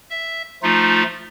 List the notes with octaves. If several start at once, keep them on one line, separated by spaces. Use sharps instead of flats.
E5
F3 A3 D#4 F4